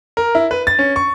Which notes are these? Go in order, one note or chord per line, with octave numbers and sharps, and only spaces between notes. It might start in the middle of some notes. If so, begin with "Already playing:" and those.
A#4
E4
B4
A6
C#4
C#6